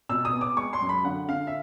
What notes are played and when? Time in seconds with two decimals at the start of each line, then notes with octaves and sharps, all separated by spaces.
0.09 B2 E6
0.25 D#6
0.33 B3
0.41 D6
0.57 G#3 C#6
0.73 C6
0.81 F#2
0.89 B5
1.05 D3 F#5
1.29 D3 F5
1.47 E5